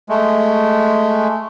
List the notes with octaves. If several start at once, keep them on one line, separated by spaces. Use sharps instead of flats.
G#3 A3